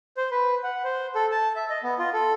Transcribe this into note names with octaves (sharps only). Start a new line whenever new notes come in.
C5
B4
F#5
C5
A4
A5
E5
D#5
B3
F4
A4